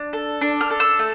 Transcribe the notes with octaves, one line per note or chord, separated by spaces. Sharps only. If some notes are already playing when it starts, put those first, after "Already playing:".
Already playing: D4
A4
D4
F6
A4
E6
A3